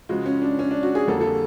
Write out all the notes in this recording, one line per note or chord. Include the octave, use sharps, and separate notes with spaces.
C#3 F3 G#3 F#4
C#4
D4
C#4
D4
F#4
G#4
F2 D3 G3 A#3 A4
A4